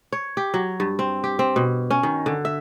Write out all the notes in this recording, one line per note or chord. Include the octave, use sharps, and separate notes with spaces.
C#5
G4
F#3
G2
C4
G4
C4
B2
C#4
D#3
D3
E5